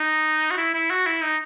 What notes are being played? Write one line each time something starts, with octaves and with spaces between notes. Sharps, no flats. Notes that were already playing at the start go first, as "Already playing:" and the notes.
Already playing: D#4
F#4
E4
E4
F#4
E4
D#4